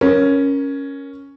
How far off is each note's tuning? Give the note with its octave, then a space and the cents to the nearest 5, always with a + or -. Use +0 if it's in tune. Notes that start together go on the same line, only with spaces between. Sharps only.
C#4 +0 A#4 +10